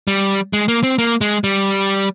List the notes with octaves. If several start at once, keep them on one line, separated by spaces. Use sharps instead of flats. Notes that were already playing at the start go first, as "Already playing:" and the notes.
G3
G#3
A#3
C4
A#3
G#3
G3